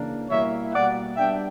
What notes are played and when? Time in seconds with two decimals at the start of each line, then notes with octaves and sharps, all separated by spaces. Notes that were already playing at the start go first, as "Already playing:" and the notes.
Already playing: C#3 E3 A#3 D4
0.29 B2 G3 A#3 E4 C#5 E5
0.73 B2 G3 A#3 D5 F#5
1.17 G3 B3 D4 E5 G5